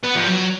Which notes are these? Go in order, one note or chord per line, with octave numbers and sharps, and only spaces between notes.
B3
F3
F#3